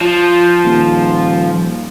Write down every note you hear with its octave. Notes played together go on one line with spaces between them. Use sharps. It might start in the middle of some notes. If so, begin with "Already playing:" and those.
F3
D#1